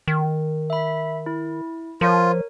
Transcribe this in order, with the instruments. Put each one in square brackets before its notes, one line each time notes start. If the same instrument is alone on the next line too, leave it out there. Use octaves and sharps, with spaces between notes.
[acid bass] D#3
[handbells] E5 B5
E4
[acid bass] F3 [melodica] F4 [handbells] A#4 C#5